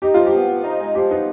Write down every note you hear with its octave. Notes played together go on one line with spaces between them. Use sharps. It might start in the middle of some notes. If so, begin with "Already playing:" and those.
D#4 G4
F3 F4
G4
B3
F3
D#4
G#3
F3 G4
B3 D#4